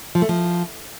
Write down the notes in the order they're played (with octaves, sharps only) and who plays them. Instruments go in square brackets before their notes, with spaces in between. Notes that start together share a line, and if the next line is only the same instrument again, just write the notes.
[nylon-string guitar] F3
A3
F3